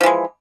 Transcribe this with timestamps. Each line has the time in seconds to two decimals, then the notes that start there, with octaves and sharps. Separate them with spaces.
0.01 F3
0.03 E3
0.06 G#3